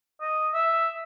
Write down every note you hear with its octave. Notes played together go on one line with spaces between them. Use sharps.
D#5
E5